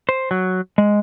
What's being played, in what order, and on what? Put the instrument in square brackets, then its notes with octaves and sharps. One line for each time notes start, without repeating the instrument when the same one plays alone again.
[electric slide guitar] C5
F#3
G#3